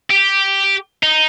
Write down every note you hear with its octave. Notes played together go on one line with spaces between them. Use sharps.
G4
D#4